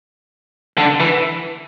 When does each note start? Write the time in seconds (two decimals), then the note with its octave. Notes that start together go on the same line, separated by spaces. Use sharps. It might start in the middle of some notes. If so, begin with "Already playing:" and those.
0.78 D3
1.00 E3